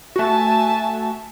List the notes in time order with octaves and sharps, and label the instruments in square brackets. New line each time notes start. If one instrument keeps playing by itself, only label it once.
[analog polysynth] A3 F#4 [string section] E5 G#5 A5